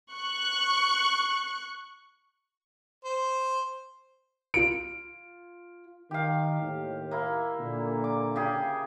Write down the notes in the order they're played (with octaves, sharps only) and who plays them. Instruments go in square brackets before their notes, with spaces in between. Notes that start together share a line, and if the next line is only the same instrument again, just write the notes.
[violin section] C#6 F#6 C#7
[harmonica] C5
[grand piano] F4 D7
[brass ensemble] D#3 [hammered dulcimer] G4 F5
[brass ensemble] D#2 A2
[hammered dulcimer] A#3 E4
[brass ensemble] A#2 D3
[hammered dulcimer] D6
C#3 G4 G#4